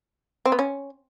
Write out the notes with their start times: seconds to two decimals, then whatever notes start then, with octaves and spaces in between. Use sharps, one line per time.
0.46 C4
0.52 B3
0.59 C#4